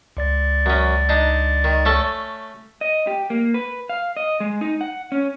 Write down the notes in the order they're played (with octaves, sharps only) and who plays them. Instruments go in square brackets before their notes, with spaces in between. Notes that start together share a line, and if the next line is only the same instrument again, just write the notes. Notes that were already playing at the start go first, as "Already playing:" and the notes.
[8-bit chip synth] C#2 D5 A6
[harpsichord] F#2 C#4
D4 D#4
D#3
A3 C#4 A4
[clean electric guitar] D#5
G4
A#3
B4
F5
D#5
G#3
D#4
F#5
C#4